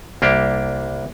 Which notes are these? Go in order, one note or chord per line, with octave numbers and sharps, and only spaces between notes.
C2 A#3 D4 G4